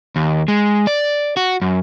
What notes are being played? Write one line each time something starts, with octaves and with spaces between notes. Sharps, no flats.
D#2
G#3
D5
F#4
F#2